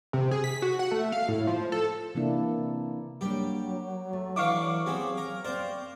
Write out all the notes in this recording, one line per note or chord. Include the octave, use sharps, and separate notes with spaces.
C3
G#4
B6
F#4
F#5
A3
F5
A2
F3
A4
C3 E3 A#3 D4 E4
F#3 G3 A#3 D4 G4
A3
E3 D4 E4 F5 C#6 D6
B3 C4 G4 G#4
A#4
C4 A#4 C5 D5